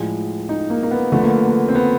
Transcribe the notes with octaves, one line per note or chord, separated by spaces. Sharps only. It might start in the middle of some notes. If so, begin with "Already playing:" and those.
Already playing: A2 F3 G#3 D4
D#4
A#3
A#3
B3
D3 F3 A3 B3
A#3
A#3
C4
B3